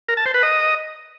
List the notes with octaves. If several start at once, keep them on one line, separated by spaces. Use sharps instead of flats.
A#4
A5
C5
B4
D#5